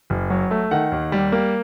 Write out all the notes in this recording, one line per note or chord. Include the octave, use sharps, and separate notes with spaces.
F#1
F#3
A3
D#3 F#5
D#2
G3
A#3